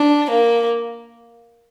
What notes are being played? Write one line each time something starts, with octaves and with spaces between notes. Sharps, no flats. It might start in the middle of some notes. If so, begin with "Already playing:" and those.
Already playing: D4
A#3